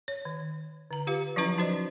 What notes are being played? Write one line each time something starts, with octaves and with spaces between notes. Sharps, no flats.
C#5
D#3
D3 A#5
F4 G4 B4 F5
F3 F#3 C#4 E4 B4 A#5
C#4 D#4 F#4 C5 D5 D#5